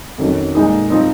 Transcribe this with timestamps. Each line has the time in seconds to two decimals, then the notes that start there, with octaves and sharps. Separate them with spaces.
0.18 F2 D#3 F#3 C#4
0.55 A#2 G#3 D#4
0.90 F3 C4 D#4